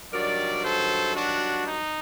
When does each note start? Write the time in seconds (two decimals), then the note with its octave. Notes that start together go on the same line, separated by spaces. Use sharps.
0.12 G2 D#3 F#3 A#4 D5
0.63 A4 C5
1.15 D4 F#4
1.66 D#4